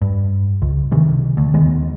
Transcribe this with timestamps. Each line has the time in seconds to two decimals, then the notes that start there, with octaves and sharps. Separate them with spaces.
0.02 G2
0.62 C#2
0.92 C3 D#3 E3
1.37 D2
1.54 D#2 D#3 G#3 B3